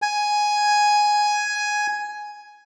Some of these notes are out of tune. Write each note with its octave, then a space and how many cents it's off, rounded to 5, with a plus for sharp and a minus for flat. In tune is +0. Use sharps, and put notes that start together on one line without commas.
G#5 +5